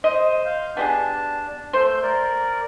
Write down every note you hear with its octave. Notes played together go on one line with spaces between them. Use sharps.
C5 D#5
F5 G6
B3 D4 G4 G#4 A5
A3 C5 G6
A#4 D5